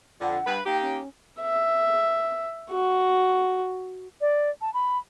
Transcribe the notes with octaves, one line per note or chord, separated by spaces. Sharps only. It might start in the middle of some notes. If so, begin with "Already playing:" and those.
F2 D3 F#5
G2 B4
A#3 D#4 G4 G5
C#4
E5
F#4
D5
A5
B5